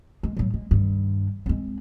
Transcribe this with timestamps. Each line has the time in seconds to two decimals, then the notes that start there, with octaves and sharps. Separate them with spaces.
0.23 G#3
0.37 A2 F#3
0.54 G#3
0.71 G2 D#3
1.46 G#3 C4